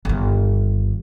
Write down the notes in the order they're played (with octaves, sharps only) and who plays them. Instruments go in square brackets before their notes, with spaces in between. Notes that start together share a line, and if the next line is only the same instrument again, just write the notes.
[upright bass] G1 D#3